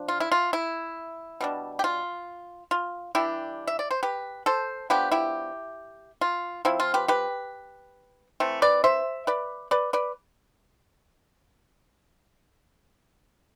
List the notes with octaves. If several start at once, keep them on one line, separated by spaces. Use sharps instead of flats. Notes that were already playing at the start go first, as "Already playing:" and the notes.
Already playing: F3 D4
F4
E4
F4
E4
B2 G3 D4
G4
F4
F4
E3 G3 D4 E4 G4
E5
D5
C5
G4 B4
A4 C5
F3 B3 D4 G4 B4
E4 G4
F4
F3 C4 E4
F4
G4 B4
G4 B4
E3 A3 C4
B4 D5
C5 E5
B4 D5
B4 D5
B4 D5